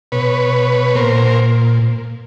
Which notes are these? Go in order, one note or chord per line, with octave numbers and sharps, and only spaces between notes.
B2 B4 C#5
A#2 A#4 C5